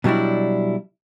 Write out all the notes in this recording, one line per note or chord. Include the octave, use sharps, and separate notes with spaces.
B2 F#3 G3 D4 E4